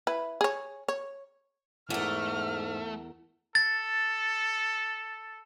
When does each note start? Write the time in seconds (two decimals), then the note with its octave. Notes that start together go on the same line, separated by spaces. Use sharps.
0.07 E4 B4
0.41 G#4 C#5
0.88 C#5
1.90 E2 G#2 A3 A#4 F6
3.55 A4 A6